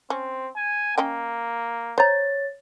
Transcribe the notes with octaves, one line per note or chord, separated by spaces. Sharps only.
C4 C#4
G#5
A#3 C#4 D#5 G5
C5 C#5 A#5 A6